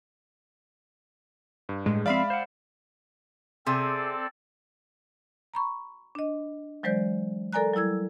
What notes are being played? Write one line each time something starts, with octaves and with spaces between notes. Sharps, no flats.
G2
A2 G#3
F3 C4 D5 E5 F5 B5 F6
C5 F#5
C3 C4 G#4 A4 D5
A#5 B5 C#6
D4 D#5
E3 F#3 G#3 C5 D5 G6
A4 A#4 D5 G#5 A#5 F#6
F#3 G3 E4 E6 G#6